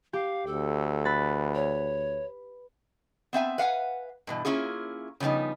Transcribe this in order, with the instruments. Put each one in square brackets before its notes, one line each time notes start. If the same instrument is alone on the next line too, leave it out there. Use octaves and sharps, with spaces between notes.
[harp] G4 [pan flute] F5
[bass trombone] D2 [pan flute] A4
[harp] B4 A6
[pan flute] C#5
[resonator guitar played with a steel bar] B3 C4 E5 G#5
B4 F5 F#5 G#5
G2 B2 E3
A#3 C#4 E4 F4 G#4
C#3 F3 G3 B3 D#4